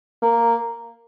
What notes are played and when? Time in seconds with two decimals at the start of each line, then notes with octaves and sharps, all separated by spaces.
0.22 A#3